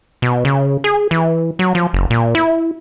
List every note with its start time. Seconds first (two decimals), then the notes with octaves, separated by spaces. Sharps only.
0.22 B2
0.45 C#3
0.84 G#4
1.11 E3
1.59 F#3
1.75 F3
1.93 F#1
2.10 A#2
2.35 E4